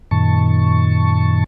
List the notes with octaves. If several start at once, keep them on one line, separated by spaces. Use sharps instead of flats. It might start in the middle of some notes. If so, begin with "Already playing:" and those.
F#2 A#2 D#3 A5 C#6